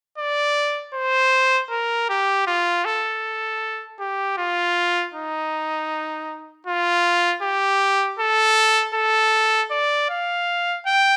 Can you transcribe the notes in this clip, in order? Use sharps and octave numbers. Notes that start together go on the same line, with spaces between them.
D5
C5
A#4
G4
F4
A4
G4
F4
D#4
F4
G4
A4
A4
D5
F5
G5